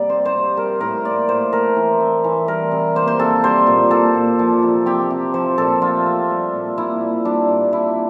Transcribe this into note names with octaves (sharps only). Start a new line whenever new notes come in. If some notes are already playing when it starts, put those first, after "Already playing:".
Already playing: C3 G3 A#3 D5
C4 C5
C5
C3
G3 A#4
A2 A#4
A#3 D5
A2 C5
A3 A#4
E3
C4
E3
G3 A#4
C3
A#3 C5
C5
C3 A4
G3 C5
A#2
A#3 A4
A#2
F3
C3
C4 G4
C3
F3 C5
A#2 A4
A3 F4
C4
G3
A#2
A#3 E4
A#2
G3 D4
A#2
A#3 E4